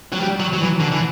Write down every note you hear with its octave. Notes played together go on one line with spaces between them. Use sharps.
F#3
G3
F#3
F#3
E3
D3
E3